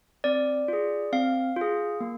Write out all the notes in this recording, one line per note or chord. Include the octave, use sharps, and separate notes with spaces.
C4 D5
F4 G#4
C4 F5
F4 G#4
A#3